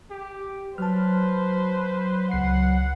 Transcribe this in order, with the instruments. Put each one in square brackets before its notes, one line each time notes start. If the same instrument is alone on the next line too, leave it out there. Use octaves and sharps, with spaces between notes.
[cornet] G4
[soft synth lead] F#3 [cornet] B4 [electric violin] C5 [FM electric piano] A5 F6
[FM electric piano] C#2 C7 [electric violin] F#5